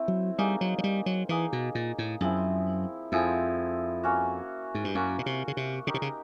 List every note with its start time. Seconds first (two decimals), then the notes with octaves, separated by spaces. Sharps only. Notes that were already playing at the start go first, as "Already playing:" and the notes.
Already playing: A3 C4 E4
0.08 F#3
0.38 G3 A#3 D#4 G#4
0.61 F#3
0.78 F#3
0.84 G3
1.06 F#3
1.29 E3 A#3 D#4 G#4
1.53 B2
1.75 A#2
1.98 A2
2.20 F#2 F3 G#3 C4 E4
3.12 F2 F3 G#3 C4 E4
4.04 A#3 C#4 F#4
4.75 G#2
4.84 G2
4.95 F#2 A#3 C#4 F#4
5.19 B2
5.26 C3
5.48 C#3
5.57 C3
5.87 C#3 D#4 G4 A#4
5.94 C3
6.02 C#3